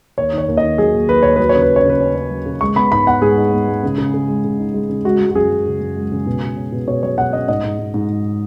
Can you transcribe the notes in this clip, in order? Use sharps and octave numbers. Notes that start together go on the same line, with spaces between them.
D#2 C#5
D#3
C#5
D#2
D#5
D#3
F#3 G#4
D#2
D#2 B4
D#2 C#5
F#3 B4
C#5
C#3
B4
C#4
C#5
C#3 B4
C#4
C#4
F#3
C#3
G#3 C#6
B3 B5
G#2 B5
B3 F#5
G#2 G#4
D#4
B3
G#3
C#3
C#3
C#3
G#3
C#3
D#4
G#3
C#3
G#3 F#4
G#3
F#4
F#2 G#4
F#2
C#3
F#2
G#3
C#3
B2
B2
C#4
B2
B2 C#5
F#3 C#5
B2 F#5
C#4 D#5
G#2 D#5
G#2
G#2
G#2
G#2